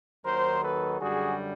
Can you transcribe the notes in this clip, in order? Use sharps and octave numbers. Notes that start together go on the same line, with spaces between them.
D#2 D#3 F#3 A#4 C5
A4 B4
F#2 D3 G3 F#4 G#4